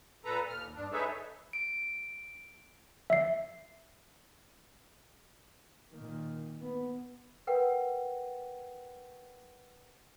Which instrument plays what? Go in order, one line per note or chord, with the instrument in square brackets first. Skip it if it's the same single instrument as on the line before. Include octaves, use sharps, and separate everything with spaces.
[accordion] A#2 A4 B4 A#5
D#2 F6
G2 D4
D#4 G#4 A4 B4 C#5 E5
[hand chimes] D7
[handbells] E5 C7
[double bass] A#2 D#3
B3
[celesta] A#4 B4 F#5 G5